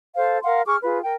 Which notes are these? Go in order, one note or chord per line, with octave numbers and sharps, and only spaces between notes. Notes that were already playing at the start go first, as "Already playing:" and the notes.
A4 C5 F5
A#4 F5 F#5 C6
G#4 C#6 D6 F6
F4 G#4 B4
A#4 G5